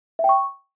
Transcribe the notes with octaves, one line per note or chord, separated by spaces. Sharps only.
E5
G5
C#6